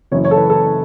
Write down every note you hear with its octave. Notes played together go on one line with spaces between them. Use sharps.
F#1 F#2 E3 C#5
C#5
A4
B4
A4